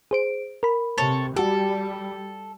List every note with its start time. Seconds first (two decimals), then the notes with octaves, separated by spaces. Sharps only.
0.11 G#4 C5 D7
0.63 A#4 B5
0.98 C3 A4 C#5
1.36 G3 F#4 G4 A4